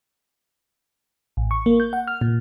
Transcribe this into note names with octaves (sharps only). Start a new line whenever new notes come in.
A1
C#6
A#3
G6
F#5
F6
A#2